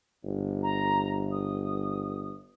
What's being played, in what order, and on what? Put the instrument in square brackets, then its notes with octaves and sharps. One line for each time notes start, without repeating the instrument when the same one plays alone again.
[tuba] G1
[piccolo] A#5
D#6